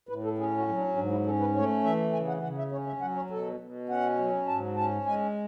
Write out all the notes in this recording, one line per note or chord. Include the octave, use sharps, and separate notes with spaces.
A2 B4
A4
C#4 G#4
F#4
F#3
D4
G#2 D4
E4
C#4 A4
B4
A3 C#5
E3 E5
C#3 G#5
F#5
C#3 F#5
E5
C#4 C#5
E5
F#3 F#5
C#5
B2 A4
B2
C#4 F#5
F#3
G#2 A5
C#4 A5
G#3 G#5